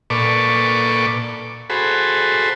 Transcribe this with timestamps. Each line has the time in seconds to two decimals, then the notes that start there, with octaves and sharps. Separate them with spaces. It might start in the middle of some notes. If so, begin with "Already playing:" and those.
0.10 A#2 A4 B4 D5 C#6 D6
1.70 F#4 G#4 A4 C5 B5